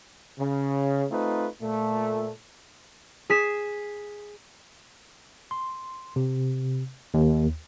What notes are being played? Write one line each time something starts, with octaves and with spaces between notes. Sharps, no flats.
C#3
A3 C4 D#4 F4 B4
A#2 A3
G#4 B6 E7
C6
C3
D#2